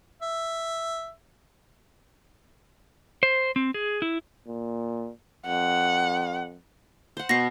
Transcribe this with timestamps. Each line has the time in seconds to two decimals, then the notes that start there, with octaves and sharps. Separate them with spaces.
0.22 E5
3.23 C5
3.56 C4
3.74 G#4
4.02 E4
4.48 A#2
5.46 F2 F#5
7.17 C5 F#5
7.29 B2 B3 C#6 A#6 C7